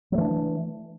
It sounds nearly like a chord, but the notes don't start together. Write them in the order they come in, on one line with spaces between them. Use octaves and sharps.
F#3 A3 E3 D4